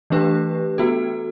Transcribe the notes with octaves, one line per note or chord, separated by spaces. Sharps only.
E3 A3 D4 G4 B4
B3 F#4 A4